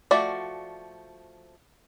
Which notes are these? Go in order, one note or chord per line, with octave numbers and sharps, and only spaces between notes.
F3 A3 F#4 D5